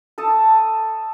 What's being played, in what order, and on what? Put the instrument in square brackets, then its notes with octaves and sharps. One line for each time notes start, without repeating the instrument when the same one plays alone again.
[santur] A4 D#5 A5